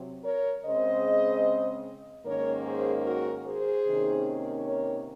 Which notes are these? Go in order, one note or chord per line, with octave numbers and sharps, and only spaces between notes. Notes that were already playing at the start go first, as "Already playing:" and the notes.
Already playing: C3 F#3 C4
A#4 C#5
C#3 G#3 C4 C5 D#5
G#2 D#3 A#3 C#4 A#4 C#5
G#4 C5
F#4 A#4
G#4 C5
C3 D#3 A#3 C#4
A#4 C#5